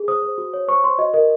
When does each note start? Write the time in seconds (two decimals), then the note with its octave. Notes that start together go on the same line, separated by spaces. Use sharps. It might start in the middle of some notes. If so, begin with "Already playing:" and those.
Already playing: G#4
0.08 C5 D#6
0.22 C5
0.38 F#4
0.54 C#5
0.68 C5 C#6
0.84 C5 C6
0.98 F#4 D#5
1.14 A#4 D#5